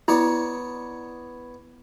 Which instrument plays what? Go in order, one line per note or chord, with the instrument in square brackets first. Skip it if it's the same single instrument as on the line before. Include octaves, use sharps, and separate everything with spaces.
[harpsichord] B3 C#5 D5 [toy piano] E4